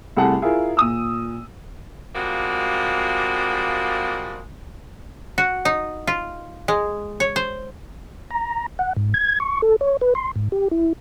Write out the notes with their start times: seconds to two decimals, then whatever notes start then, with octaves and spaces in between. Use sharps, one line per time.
0.16 C2 C3 A3 G#4 F#5 A5
0.42 E4 F4 G#4 A#4
0.77 A#2 D#6 E6
2.15 F3 G3 G#3 A#3 C4 F#4
5.38 F#4
5.65 D#4
6.07 F4
6.68 G#3
7.20 C#5
7.36 C5
8.31 A#5
8.79 F#5
8.96 G#2
9.14 G#6
9.40 C#6
9.62 A4
9.81 C#5
10.01 B4
10.15 C6
10.36 G#2
10.52 G4
10.71 E4